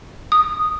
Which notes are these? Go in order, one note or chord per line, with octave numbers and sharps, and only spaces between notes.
D#6